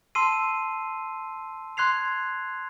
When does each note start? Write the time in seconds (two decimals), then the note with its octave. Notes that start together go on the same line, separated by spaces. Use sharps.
0.15 A5 C6 E6 C7 D#7
1.77 C6 F#6 G#6 C7 F7